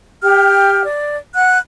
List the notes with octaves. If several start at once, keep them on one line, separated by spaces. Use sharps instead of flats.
G4 G5 F6
D5
F#5 F#6